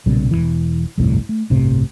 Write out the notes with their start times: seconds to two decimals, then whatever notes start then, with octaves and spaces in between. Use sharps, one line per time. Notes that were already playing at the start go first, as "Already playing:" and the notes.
0.06 B1 A#2 C#3 G3
0.31 E1 C#2 E3
0.98 G1 C2 F2 A2
1.29 A3
1.50 G1 C2 A2 C3